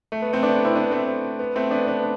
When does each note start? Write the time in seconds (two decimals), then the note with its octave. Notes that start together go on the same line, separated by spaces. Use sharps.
0.12 A3
0.22 B3
0.33 A3 C4
0.43 B3 D4
0.55 B3
0.65 C4 E4
0.75 B3 D4
0.91 A3 C4
1.39 B3
1.56 A3 C4
1.71 B3 D4
1.87 B3 D4